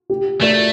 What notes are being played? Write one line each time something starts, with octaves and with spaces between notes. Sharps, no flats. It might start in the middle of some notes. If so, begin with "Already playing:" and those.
G4
A3 A#4 D5